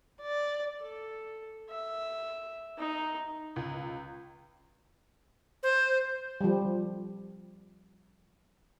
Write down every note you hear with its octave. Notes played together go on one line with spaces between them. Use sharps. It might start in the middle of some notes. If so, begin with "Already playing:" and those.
D5
A4
E5
D#4
C#2
C5
F3 G3